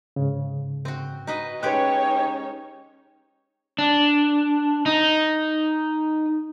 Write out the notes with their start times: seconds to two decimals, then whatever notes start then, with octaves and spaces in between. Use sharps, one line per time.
0.16 G#2 C#3
0.85 C4 F#4
1.27 D#4 F#4 B4 D#5
1.63 G#3 C#4 D#4 G4 B4 C#5 G5 F#6
3.79 D4
4.86 D#4